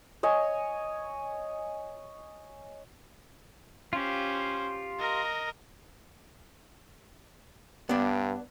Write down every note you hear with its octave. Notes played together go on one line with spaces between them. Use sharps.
C#5 D#5 G#5
C#4 F4 G4 C5
A#4 D#5
G2 B3 D4